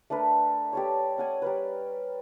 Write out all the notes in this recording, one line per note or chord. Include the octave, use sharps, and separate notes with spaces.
A3 D4 A#4 B4
G4 A4 C#5
C#4 F#5 G#5
G3 A#4 B4